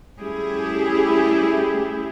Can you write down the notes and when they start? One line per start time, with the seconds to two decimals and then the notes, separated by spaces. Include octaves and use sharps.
0.19 G3 A3 C#4 E4 G4 G#4